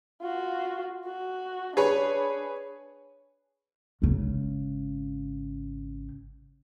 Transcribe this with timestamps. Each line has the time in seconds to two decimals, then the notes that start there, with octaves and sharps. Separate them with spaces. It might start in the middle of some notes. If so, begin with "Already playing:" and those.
0.21 F4 F#4
1.06 F#4
1.77 D4 G#4 B4 C#5
4.02 G#1 C#3